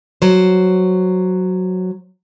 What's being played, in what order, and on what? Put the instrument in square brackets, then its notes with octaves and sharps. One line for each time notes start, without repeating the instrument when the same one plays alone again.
[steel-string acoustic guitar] F#3 C5